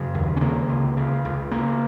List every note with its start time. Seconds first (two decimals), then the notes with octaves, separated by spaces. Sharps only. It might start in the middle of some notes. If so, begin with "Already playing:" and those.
Already playing: F#2 C#3
0.14 D#2
0.37 C#4
0.41 C#3 A#3
0.69 C#2
0.97 C#3
1.25 C#2
1.51 C#3 A#3